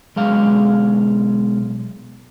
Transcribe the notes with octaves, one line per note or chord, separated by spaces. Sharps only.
B1 G#3 F5